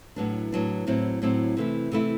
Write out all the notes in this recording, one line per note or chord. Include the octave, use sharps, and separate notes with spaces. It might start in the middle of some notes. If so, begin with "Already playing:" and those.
A2 F#3 B3 D4
A2 F#3 B3 D4
A2 F#3 C4 E4
A2 F#3 C4 E4
C3 E3 A3 E4
C3 E3 A3 E4